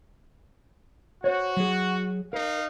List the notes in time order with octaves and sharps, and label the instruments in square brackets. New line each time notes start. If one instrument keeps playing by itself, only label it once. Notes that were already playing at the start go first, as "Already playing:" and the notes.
[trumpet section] F#4 [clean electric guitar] C5 C#5
[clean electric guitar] F#3 G#4
[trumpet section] D#4 F5 [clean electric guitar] A#4